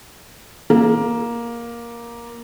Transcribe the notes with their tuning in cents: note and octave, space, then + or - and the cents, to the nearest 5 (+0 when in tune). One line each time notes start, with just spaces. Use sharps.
A#3 +10